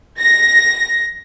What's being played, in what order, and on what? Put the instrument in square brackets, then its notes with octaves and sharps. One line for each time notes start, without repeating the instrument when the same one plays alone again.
[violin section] A#6